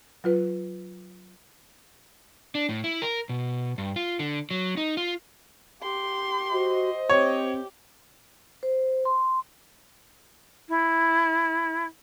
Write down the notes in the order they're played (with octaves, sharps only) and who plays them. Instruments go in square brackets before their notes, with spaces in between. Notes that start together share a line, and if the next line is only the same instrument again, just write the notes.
[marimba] F#3 F4 B4
[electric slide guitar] D4
A2
E4
A#4
B2
G2
F4
D3
F#3
D#4
F4
[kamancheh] G4 C6
[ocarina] F#4 [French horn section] C5 D#5
[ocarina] C4 [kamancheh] G4 [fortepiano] C#5
[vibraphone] C5
C6
[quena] E4